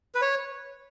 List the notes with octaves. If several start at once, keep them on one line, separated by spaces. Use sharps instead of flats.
B4
C#5